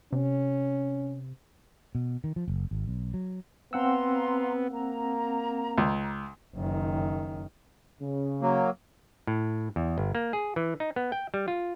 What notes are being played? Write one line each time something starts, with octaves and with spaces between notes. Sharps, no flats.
C3 C#4
B2
D#3
F3
F#1
G#1
B1
F#3
B3 C4 F5 F#5 A#5 C6 E6
A#3 A#5
C#2
F#1 D#3
C#3
F#3 A#3
A2
E2
G1
A#3
G#4
E3
D#4
B3
G5
G3
F4